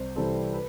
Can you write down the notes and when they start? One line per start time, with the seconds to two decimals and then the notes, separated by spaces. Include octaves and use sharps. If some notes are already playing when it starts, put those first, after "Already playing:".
Already playing: C2 C5
0.16 C3 E3 G3 C4 A4
0.54 B4